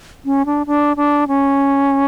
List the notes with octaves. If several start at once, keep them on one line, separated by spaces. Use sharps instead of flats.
C#4
D4
D4
D4
C#4